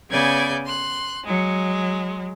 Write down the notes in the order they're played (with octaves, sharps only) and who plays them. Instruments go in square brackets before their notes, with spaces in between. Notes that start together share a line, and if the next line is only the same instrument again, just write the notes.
[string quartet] C#3 B3 D5 G#5 G6 G#6
C6 F#6
F#3 G#3